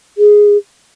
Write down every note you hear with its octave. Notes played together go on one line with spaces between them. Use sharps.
G#4